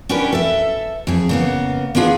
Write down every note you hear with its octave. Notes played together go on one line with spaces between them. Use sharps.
C#4 D4 F#4 G4 A#4 B4
A4 E5
F2 G#4
C#3 A#3 B3
A#3 B3 D4 F4 G#4